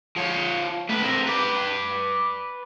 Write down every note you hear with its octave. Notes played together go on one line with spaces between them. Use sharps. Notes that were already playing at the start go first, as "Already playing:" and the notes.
F3 C#5
A3 B4
C4 A#4
B4 D5